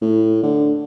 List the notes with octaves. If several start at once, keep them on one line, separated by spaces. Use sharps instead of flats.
A2
D3